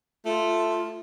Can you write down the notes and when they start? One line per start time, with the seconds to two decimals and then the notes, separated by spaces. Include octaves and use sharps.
0.25 A3 F4